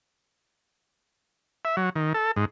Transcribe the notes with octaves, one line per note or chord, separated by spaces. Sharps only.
E5
F#3
D#3
A4
G#2